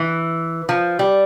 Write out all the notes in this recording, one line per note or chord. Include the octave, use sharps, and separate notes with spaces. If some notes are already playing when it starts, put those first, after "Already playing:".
Already playing: E3
F3
G3